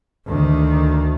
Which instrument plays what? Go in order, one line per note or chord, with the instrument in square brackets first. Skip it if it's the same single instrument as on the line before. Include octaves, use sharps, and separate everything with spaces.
[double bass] D2 D#3